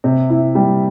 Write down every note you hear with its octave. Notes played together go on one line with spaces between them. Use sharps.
C3
E4
G3